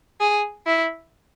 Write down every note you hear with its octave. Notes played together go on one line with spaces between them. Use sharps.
G#4
E4